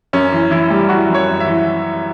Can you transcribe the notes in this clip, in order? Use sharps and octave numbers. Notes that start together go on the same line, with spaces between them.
F#2 C#4
E3
E3 E4
G3
E3 F#4
F#2
C#5
F#2
E5
E3